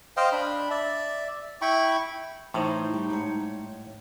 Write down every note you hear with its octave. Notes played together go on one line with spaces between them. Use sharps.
C5 D#5 F5 G5
D4 B5
D5 E5
E4 G5 B5 C#6
A2 E3 D#4 C5 D#5
G3
G#2 C#5